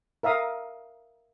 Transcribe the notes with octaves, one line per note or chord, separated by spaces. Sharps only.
A#4 E5 F5 D#6